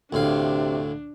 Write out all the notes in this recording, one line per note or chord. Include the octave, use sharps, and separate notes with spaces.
D2 A2 C3 D4 F5